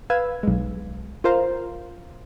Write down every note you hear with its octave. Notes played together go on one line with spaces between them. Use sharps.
B4 F5 E6 G#6
B1 G#3
F4 A#4 C5 F5 A#5